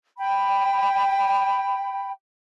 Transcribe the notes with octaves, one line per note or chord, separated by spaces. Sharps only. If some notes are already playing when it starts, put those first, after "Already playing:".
G5 B5